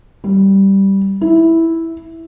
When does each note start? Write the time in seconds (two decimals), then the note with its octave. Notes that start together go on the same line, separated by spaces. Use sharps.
0.24 G3
1.21 E4